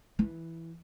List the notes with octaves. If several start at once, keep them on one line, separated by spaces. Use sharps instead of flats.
E3